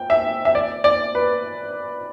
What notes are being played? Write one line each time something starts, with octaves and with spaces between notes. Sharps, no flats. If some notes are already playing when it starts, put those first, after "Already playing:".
Already playing: G5
E5
E5
D5
D5
B4